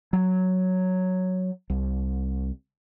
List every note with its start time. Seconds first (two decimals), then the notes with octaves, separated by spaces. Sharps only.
0.13 F#3
1.70 C2